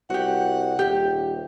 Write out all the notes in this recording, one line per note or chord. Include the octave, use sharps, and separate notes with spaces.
C2 F#4 G4 F#5
D#1 G4